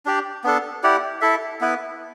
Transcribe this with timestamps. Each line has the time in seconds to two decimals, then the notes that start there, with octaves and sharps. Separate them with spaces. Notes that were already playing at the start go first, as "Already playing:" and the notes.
0.06 D4 G4 D5
0.44 B3 D4 A4
0.83 E4 G4 D5 F#5
1.21 E4 A4 E5
1.61 B3 E4 B4